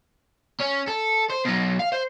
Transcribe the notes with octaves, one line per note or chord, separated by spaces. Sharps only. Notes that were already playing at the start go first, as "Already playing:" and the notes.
C#4
A4
C5
B2 F#3
F5
C5